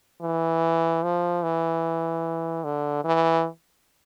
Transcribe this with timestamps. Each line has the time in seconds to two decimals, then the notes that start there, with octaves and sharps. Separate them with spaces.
0.22 E3
1.03 F3
1.43 E3
2.64 D3
3.04 E3